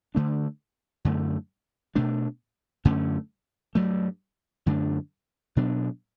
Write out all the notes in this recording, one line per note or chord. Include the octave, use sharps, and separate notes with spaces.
D3 A3 D4
F#2 D3 A3
B2 A3 D4
F#2 D3 A3 C#4
G2 F#3 A3
F#2 D3 A3 D4
B2 F#3 B3 D4